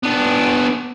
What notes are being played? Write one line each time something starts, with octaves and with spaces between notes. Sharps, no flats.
B3 D4